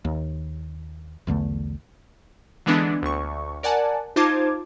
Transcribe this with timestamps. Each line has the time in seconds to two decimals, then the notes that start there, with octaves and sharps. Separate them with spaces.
0.05 D#2
1.27 B1 E2 D3 A3
2.66 D3 E3 G#3 B3 D4
3.02 D2 C#6
3.63 A#4 D5 F#5 G#5 A5
4.16 D#4 F4 C5 A5 D6 G#6